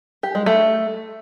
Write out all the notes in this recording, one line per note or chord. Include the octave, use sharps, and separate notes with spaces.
G4
G#3
A3